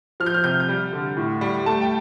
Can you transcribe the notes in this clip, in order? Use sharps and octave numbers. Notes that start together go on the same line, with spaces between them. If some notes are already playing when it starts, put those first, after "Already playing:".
F3 F6
G6
F6
C3 G6
G6
G3
D3
A2
G3
A3 A5
G5